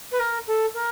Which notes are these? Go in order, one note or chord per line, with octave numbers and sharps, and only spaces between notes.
B4
A#4
A4
A#4